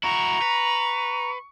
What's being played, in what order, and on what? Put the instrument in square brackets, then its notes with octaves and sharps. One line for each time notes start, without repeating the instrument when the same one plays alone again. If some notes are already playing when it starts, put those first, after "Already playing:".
[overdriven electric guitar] E4 F#4 [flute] A#5 [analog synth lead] C#6
[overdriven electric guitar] B4